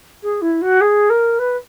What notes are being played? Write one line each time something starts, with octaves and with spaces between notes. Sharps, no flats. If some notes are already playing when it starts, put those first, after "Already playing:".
G#4
E4
F#4
G#4
A#4
B4